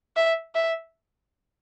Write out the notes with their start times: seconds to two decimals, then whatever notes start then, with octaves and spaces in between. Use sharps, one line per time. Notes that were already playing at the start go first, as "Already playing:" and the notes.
0.17 E5
0.55 E5